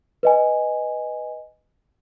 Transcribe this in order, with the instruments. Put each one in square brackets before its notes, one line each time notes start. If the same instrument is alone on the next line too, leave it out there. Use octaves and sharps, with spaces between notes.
[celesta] B4 D#5 G#5